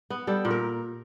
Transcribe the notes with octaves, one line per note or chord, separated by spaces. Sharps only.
B3
G3 A4
A#2
A#4